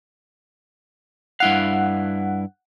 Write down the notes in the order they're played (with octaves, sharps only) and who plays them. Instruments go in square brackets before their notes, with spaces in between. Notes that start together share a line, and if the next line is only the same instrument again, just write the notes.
[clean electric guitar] G2 E4 F5 [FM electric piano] F#5